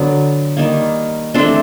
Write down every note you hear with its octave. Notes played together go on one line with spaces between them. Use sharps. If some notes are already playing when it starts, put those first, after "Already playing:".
Already playing: D3 F#3 B3
D#3 G3 A#3
E3 A3 C4 D4